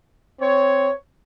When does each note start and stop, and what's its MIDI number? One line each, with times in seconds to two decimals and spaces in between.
0.41 0.90 60
0.41 0.90 73